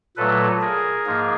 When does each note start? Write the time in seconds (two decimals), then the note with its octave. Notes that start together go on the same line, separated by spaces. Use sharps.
0.16 A#2 F#3 A3 A4 B4
0.61 G#4 A#4
1.06 G#2 F3 A#3